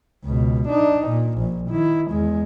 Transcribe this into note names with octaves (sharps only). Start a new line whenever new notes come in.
C#2 B2
D4 D#4
A#2
A#1 A#2
D#3 E4
E2 G#3